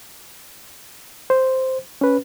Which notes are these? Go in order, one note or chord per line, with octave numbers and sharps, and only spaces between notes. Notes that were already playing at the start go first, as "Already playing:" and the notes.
C5
C#4 B4